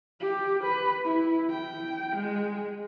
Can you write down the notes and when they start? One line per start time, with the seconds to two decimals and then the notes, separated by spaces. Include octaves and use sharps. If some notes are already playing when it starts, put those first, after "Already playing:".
0.20 G4
0.64 B4
1.05 E4
1.50 G5
2.16 G#3